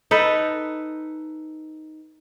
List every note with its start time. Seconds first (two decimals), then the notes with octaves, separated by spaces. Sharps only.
0.11 D#4 A4 B4